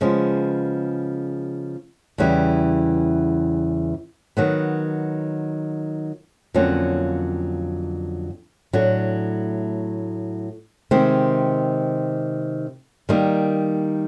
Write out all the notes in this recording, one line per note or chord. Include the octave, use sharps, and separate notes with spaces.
C#3 F3 G#3 B3
E2 C#3 E3 G3
D#3 F#3 B3
F2 D3 F#3 A#3 C#4
A2 F#3 A3 D4
C3 D#3 G#3 C4
D#3 G3 A#3 D#4